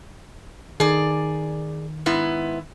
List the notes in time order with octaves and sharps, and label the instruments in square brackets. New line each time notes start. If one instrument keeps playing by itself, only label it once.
[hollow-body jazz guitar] D#3 [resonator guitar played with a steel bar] G#4 D5
[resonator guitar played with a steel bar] G#2 B3 E4